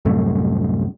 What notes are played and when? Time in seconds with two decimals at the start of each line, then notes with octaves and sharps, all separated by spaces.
0.05 C2 F#2 A2 A3